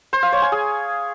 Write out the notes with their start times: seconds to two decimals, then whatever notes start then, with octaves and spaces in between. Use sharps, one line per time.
0.13 C5
0.23 F5
0.32 C#5
0.42 G#5
0.52 G#4